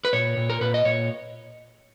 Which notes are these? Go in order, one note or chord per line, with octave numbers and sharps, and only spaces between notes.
B4
A#2 C#5
A#2
A#4
A#2 B4
D#5
A#2 C#5